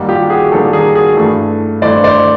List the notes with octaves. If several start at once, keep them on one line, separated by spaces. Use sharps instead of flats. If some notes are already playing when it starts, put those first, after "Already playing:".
Already playing: G#2 D#3 G3 A#3
F4 G4
F#4 G#4
G#2 D#3 G3 A#3 G4 A4
G#4 A#4
F#4 G#4
G2 E3 A3
G2 E3 A3 C5 D5
C5 D5